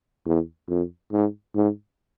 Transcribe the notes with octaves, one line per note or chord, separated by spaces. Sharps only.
E2
F2
G#2
G#2